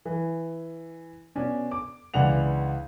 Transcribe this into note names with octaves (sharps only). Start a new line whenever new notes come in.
E3
B2 C#4 D4
D6
C#2 E3 D4 F#5 F7